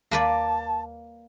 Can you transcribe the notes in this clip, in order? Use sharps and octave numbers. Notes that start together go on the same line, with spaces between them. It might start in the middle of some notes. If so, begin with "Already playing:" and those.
D#2 A#3 B4 D5 A5